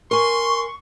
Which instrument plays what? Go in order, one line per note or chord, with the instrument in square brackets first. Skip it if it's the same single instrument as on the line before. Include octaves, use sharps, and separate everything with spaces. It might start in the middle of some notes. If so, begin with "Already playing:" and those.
[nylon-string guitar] A#4 G#5 [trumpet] C6 [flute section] C#6